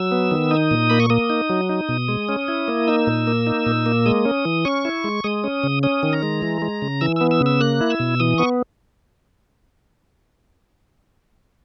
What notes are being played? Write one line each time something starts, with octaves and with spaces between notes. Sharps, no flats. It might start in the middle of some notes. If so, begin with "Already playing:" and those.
Already playing: F#3 E6
B3
D#3
D#4 D#6
A#2
A#3 B5
C#6
A#3 D#6
D#4
F#3
D#4
B2
G#3
C#4
E4
A#3
D#4 E6
A#2
A#3
D#4
A#2
A#3
G#3 D#6
C#4
E3
C#4 C#6
E4
G#3
G#3 D#6
C#4
C#3
C#4 D#6
D#3
A#5
G#3
E3
G#3
C#3
E3 E6
B3 E6
E6
C#3
E6
A#3 F#6
E4
E6
B2
E3 D#6
B3 C#6